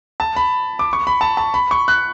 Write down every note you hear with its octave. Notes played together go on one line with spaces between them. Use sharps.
A5
B5
D6
C#6
B5
A5
A5
B5
C#6
F#6